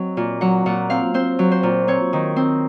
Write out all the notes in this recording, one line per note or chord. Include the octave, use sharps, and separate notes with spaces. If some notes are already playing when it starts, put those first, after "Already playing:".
Already playing: F#3 C4 D#5
A#2
F#3 F#5
A#2 F#5
C4 F5
C4 C5
F#3
C5
A#2
C4 C#5
D#3
C4